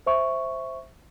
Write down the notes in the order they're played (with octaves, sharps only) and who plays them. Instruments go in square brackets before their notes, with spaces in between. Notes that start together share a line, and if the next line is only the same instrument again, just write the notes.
[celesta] C5 E5 C#6